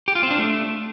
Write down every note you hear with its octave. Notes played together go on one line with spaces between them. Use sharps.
G4
F4
C4
D4
A3